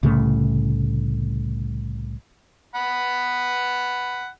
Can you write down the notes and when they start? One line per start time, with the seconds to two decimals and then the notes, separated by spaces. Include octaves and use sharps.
0.03 C2 A2 C#3 A3
2.75 F#5 B5